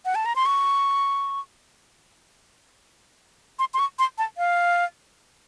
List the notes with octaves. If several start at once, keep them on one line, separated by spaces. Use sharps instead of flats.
F#5
A5
A#5
C6
C#6
C6
C6
C#6
C6
A5
F5